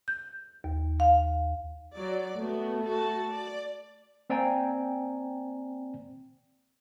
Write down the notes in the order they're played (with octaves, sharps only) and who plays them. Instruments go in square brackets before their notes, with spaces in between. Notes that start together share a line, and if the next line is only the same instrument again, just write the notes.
[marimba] G6
D#2
F5
[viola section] F#3 D5
[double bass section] A3 [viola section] B3 F#4
[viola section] F#4 A4 A5
D5
[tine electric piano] A#3 C4 D5 G5 G#5 A#5